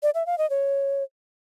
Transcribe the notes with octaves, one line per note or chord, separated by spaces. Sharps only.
D5
E5
F5
D#5
C#5